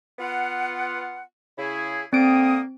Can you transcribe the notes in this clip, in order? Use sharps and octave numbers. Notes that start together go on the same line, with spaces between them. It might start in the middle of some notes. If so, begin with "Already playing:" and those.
B3 F4 F#5
C#3 E4 G#4
D3 A#3 C4 D#6 D7